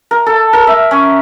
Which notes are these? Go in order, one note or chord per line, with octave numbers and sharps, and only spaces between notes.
A#4
A4
A#4
E5
C#4